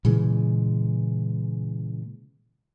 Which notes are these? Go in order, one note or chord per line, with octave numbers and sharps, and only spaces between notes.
A#2 C#3 E3 G#3